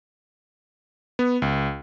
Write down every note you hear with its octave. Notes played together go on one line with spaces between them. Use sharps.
B3
C#2